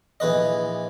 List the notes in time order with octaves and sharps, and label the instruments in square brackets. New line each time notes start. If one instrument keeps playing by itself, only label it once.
[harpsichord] A#1 E3 B4 D#5